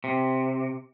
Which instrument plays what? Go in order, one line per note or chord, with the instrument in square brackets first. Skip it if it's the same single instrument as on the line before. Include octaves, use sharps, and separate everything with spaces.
[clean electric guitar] C3